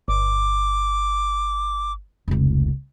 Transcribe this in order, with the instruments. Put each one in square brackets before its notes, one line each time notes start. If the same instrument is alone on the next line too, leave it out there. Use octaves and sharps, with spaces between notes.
[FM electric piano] G1 [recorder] D6
[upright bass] F1 C#2